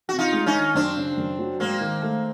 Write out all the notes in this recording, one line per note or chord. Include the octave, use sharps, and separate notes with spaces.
C3 F#4
D#4 F4
G#3
C#4 D#4
D#3
F#2 C4 D4
C#3
F#2
F#3
G#2 A#3 C4
D#3
A3